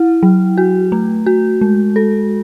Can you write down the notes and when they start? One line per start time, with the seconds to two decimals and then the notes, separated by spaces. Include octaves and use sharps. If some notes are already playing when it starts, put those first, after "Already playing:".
Already playing: E4
0.23 F#3
0.58 F#4
0.92 A3
1.26 F#4
1.61 G#3
1.96 A4